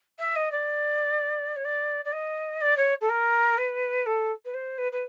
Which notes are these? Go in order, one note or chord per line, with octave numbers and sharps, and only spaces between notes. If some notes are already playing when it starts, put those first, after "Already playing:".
E5
D#5
D5
C#5
D5
D5
D#5
D5
C#5
A4
A#4
B4
A4
B4
C5
B4
B4